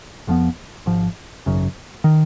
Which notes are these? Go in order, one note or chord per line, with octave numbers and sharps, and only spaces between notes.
F1 F2 F3 B3
G#1 G#2 F3
G#1 F#2 C#3
D#3